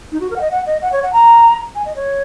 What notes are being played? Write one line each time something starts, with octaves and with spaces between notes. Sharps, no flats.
D#4
F#4
A#4
F#5
D#5
F#5
D#5
F#5
C#5
F#5
A#5
G#5
D#5
C#5